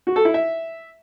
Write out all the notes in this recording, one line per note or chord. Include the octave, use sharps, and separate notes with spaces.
F#4
A4
E4
E5